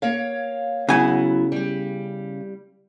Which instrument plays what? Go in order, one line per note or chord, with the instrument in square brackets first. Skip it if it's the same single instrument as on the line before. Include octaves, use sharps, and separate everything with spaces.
[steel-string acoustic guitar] A#3 C#5 F5
[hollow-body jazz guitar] C#3 G#5 [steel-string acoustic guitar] F#3 B3 E4
[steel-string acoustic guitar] G3 G4